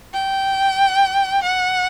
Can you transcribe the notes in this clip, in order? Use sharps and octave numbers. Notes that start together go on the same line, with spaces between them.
G5
F#5